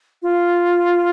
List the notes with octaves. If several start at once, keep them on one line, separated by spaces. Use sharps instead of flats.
F4